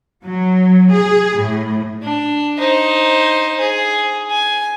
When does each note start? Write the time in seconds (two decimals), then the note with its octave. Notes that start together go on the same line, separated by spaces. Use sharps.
0.24 F#3
0.92 G#4
1.40 A2
2.03 D4
2.59 D#4 C5
3.60 G#4
4.31 G#5